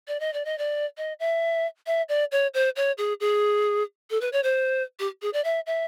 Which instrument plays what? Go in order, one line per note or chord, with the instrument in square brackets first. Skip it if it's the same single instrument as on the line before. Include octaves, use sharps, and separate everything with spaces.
[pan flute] D5
D#5
D5
D#5
D5
D#5
E5
E5
D5
C#5
C5
C#5
G#4
G#4
A4
B4
C#5
C5
G4
G#4
D5
E5
E5